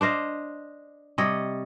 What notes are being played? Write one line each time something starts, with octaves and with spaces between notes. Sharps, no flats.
D4 C5 D#5 F5
C3 G3 C#5 D#5